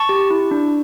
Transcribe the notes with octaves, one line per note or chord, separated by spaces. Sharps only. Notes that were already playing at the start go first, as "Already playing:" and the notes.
Already playing: A5 C#6
G4
E4
D4